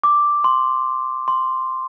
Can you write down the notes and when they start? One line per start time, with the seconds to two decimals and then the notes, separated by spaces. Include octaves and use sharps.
0.04 D6
0.44 C6
1.28 C6